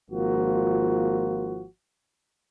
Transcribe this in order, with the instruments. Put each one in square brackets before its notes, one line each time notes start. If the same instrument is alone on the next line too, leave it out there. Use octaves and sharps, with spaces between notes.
[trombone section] G#1 F3 A#3 F4 F#4